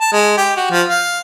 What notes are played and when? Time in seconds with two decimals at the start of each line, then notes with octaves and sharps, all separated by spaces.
0.01 A5
0.12 G#3
0.37 G4
0.56 F#4
0.71 F3
0.89 F5